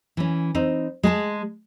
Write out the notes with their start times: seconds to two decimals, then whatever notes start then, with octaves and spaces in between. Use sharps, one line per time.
0.17 E3 C#4
0.55 C4 D#4
1.03 G#3 G#4 A5